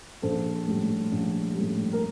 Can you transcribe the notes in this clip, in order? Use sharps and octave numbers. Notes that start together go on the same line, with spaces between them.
A#1 A4 C5
A2 G3
A#1
G3
A2
A#4